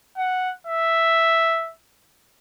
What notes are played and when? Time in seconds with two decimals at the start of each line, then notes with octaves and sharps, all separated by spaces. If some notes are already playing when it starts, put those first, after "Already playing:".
0.17 F#5
0.67 E5